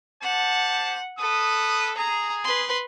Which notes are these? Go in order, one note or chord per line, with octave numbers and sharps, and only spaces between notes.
G4 C5 F#5 A5
A4 B4 D#6
G#4 A#5
B4 C6